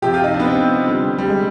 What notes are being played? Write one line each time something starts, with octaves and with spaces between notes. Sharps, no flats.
C3 F3 G4
F4
D#4
D4
B3
C4
D3 G3
G3
G#3